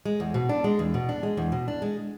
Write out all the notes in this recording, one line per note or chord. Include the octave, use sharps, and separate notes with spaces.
G#3
E2
B2
D4
G#3
E2
B2
D4
G#3
E2
B2
D4
G#3